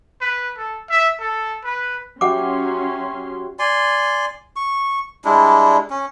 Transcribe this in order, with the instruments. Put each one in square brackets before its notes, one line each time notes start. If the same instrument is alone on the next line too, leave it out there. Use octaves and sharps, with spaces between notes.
[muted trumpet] B4
A4
E5
A4
B4
[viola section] F#3 C#4 C6 [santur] F#4 G4 E5 [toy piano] F#5 D6
[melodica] D5 G#5 C6
C#6
G3 G#3 D4 E4
C#4